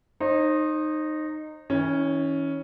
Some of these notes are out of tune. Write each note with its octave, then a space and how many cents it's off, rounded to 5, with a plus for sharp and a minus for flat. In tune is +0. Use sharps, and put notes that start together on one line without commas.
D#4 -15 C5 +35
E3 -40 C#4 +0